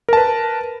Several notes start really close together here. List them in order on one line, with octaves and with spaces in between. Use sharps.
A#4 A5 B4